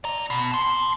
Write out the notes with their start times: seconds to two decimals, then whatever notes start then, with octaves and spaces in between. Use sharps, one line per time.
0.04 D5 A#5
0.30 B2
0.51 A5 C6